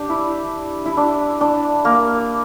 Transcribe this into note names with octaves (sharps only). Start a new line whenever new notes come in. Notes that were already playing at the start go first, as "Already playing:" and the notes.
Already playing: D4 G4
E4
E4
D4
D4
A#3